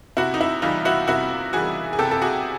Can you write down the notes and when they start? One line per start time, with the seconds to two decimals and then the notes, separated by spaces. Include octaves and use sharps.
0.17 C3 E4 F#4
0.34 D#4
0.41 E4
0.62 E3 G3 D#4 F4
0.85 E4 F#4
1.08 C3 E4 F#4
1.53 E3 G3 F#4 G#4
1.93 G#4
1.99 C3 G4 A4
2.11 A4
2.22 F#4 G#4